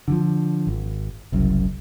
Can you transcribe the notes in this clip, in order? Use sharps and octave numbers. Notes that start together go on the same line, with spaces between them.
D3 E3 F3
G#1
F#1 C2 F#2